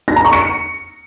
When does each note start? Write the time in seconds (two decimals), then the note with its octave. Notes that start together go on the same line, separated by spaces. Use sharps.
0.08 A#6
0.16 A#5
0.25 C#6
0.33 C#7